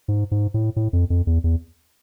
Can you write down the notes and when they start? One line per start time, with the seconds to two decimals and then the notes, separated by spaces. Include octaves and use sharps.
0.08 G#2
0.31 G#2
0.54 A2
0.76 A2
0.93 F2
1.10 F2
1.27 E2
1.44 E2